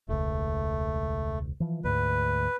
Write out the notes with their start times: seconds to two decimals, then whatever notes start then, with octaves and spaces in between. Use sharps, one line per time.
0.09 E1 C#2 A3
1.60 E3 F3
1.84 D2 G#2 B4